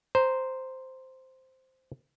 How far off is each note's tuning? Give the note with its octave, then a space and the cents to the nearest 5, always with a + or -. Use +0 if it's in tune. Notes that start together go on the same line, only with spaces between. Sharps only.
C5 -5 A#5 +0